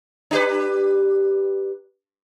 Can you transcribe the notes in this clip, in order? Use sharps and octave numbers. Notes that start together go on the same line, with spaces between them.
D4 G4 B4